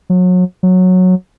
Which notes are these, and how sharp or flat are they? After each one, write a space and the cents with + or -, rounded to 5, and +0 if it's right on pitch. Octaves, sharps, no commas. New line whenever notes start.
F#3 -30
F#3 -10